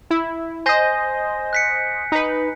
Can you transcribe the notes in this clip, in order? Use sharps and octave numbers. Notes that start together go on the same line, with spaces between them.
E4
C5 D#5 G#5 G6 A#6
F#6 B6 C#7
D#4 B4